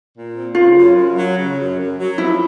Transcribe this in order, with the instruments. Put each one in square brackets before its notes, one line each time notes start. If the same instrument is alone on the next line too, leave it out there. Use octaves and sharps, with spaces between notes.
[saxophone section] A#2
C4
[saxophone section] C#3 [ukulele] F4
[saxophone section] F#2
F#2
F#3
C#3
F#2
F#2
F#3
[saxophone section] F3 [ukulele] E4